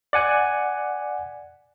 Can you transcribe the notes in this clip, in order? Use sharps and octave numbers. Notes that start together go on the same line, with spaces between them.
D5 F#5 G#5 F#6